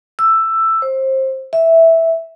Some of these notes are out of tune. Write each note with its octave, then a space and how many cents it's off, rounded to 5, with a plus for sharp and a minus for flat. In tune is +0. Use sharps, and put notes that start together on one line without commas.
E6 +10
C5 +25
E5 -5